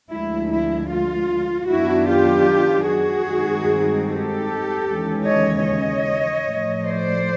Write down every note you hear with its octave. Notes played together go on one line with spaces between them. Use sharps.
D2 D3 F3 G#3 E4
E4
F4
F#2 D#3 F#3 B3 D4 E4 F#4
F4 G4
F#4 G#4
G2 D#3 G#3 C4 D#4
G4 A4
D#2 C#3 E3 G#3 C#4
C#5 D#5
C#5 D#5
A2 F3 A3
C5 D5